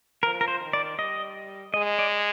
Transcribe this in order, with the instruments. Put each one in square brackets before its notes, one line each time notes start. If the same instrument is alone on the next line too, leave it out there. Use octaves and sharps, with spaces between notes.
[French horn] F3 [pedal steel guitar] A#4
[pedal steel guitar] A#4
C5
[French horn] D#3
[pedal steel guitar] D5
[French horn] G3 [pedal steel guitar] D#5
[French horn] G#3 [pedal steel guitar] D#5
[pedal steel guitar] D5